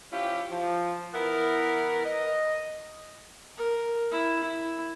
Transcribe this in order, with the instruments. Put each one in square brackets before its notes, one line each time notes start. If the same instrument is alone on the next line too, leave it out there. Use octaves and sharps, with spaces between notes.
[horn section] F3 C#4 E4 F4 G4
F3
E3 B3 E4 A#4
D#5
[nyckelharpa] A#4
E4
E4